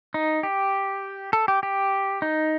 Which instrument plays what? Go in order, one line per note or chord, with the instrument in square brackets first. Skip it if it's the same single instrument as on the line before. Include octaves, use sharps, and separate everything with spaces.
[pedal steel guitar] D#4
G4
A4
G4
G4
D#4